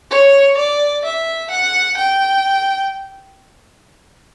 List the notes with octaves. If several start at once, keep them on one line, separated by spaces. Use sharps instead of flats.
C#5
D5
E5
F#5
G5